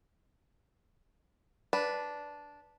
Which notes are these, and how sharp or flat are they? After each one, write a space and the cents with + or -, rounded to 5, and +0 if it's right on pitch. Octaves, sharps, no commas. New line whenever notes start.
D4 -5 B4 +0